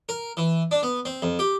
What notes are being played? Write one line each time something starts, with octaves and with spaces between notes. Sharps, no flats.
A#4
E3
D4
B3
C4
F2
G4